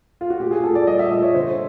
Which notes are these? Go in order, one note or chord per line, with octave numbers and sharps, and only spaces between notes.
F4
F#4
A#2 G4
G#4
A#2 A4
D5
G3 D#5
E5
A#2 D#5
C#5
D3 C5